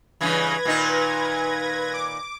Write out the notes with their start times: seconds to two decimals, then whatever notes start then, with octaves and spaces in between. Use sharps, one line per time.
0.21 G2 C#3 E3 B4 G#6 A#6
0.65 A#2 D#3 D#4
1.94 D6